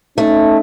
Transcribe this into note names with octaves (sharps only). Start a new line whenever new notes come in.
A3 C#4 D#4